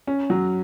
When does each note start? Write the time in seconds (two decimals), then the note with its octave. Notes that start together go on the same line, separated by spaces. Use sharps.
0.07 C#4
0.30 F#3